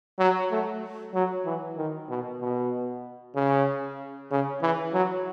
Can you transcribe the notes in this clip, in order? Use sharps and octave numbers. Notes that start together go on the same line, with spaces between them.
F#3
A3
F#3
E3
D#3
B2
B2
C#3
C#3
E3
F#3